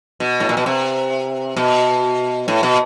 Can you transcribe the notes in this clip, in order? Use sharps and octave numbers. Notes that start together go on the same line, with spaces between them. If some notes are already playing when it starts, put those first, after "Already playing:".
B2
A2
A#2
B2
C3
B2
A2
B2